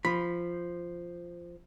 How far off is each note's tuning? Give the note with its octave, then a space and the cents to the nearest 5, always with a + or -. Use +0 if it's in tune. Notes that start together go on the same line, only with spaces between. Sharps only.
F3 -10 B5 +0